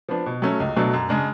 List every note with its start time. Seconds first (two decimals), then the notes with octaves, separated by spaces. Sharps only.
0.09 F3 B3 D4
0.26 B2
0.42 F#3 A3 C#4
0.60 C#2
0.76 B2 F#3 A3 D4
0.93 F#2
1.09 C#3 G#3 D4